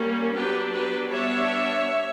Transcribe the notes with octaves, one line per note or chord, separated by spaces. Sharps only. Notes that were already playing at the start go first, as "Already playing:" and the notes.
Already playing: G3 A#3 C#4
F#3 B3 D4 G4 B4
G4 B4
G3 B3 D4 C#5 E5